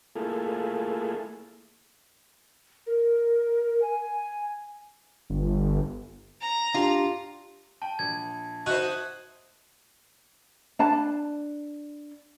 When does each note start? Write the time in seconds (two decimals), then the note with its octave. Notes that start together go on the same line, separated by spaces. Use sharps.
0.16 A3 A#3 E4 F4 G#4 A4
2.87 A#4
3.82 G#5
5.30 G1
6.41 A#5
6.74 D4 F4 G4
7.82 G5 A5
7.99 A#1 G#6
8.66 D#4 F#4 C5 E5 F#6
10.79 D4 A5